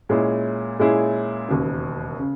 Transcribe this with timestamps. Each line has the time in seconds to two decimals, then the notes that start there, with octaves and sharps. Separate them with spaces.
0.09 A#2 G#3 C#4 E4 G#4
0.79 A#2 G#3 C#4 E4 G#4
1.49 E1 D#2 C#3
2.20 C#3